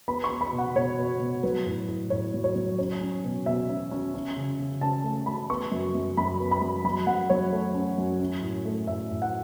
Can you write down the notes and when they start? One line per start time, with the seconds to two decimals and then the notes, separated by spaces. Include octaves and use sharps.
0.08 B3 B5
0.24 C#6
0.30 B3
0.41 B5
0.53 B2
0.58 F#5
0.76 B2 C#5
0.98 B2
1.20 B2
1.43 F#3 B4
1.66 A2
1.88 A2
2.10 A2 C#5
2.34 F#3
2.44 C#5
2.56 F#3
2.78 C#4 C#5
3.01 C#4
3.24 B2
3.46 B2 E5
3.69 C#4
3.91 C#4
4.14 C#4
4.36 C#3
4.59 C#3
4.81 C#4 A5
5.04 A3
5.26 A3 B5
5.50 B3 C#6
5.72 F#2
5.95 F#2
6.17 F#2 B5
6.40 B3
6.51 B5
6.62 F#2
6.84 F#3 B5
7.07 F#2 F#5
7.30 F#3 C#5
7.52 A3
7.75 C#4
7.98 F#2
8.20 C#4
8.42 A2
8.65 A3
8.87 A2 E5
9.11 A2
9.22 F#5